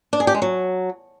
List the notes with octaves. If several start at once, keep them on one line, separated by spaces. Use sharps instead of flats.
D4
G#4
G4
G#3
F#3